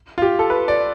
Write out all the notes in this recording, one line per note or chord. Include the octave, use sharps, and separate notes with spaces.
F4
G4
A4
B4
D5